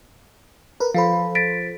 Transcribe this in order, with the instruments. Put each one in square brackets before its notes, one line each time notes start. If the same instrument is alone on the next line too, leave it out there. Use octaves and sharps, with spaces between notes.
[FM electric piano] A#4 B4
[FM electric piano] F3 A4 C5 [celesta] F5 B5
[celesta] A6 B6 D7